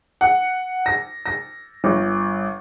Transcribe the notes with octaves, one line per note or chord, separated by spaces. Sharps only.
F#5
A#6
A#6
G1